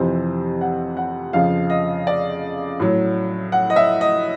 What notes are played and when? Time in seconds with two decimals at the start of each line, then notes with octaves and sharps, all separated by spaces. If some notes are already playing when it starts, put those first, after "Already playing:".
Already playing: F2 C3 E3 C5
0.61 F#5
0.97 F#5
1.33 F2 C#3 F3 F5
1.70 D#5
2.07 D5
2.80 A2 F#3
3.52 F#5
3.70 D#5
3.76 E5
4.01 D#5